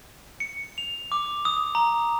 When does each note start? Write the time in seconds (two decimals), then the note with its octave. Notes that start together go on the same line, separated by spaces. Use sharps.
0.40 C#7
0.78 F7
1.12 D6
1.45 D#6
1.75 A#5